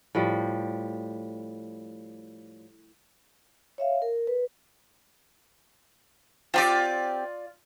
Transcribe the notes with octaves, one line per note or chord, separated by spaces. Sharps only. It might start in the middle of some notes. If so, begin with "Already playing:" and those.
A2 F3 G3
C#5 E5 F5
A#4
B4
C4 D4 F4 G4 D5